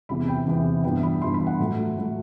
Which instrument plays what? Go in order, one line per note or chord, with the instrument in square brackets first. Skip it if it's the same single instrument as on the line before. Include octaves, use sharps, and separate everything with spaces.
[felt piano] E2 C3 E3 B3 B5
G5
E2 C3 E3 B3
G2 E3 B3 G5
B5
G2 E3 B3 C6
B5
F#5
A2 F#3 A3
A2 F#3 A3